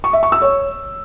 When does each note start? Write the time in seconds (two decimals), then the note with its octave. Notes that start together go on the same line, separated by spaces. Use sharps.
0.04 C#6
0.13 E5
0.23 C#6
0.32 E6
0.42 C#5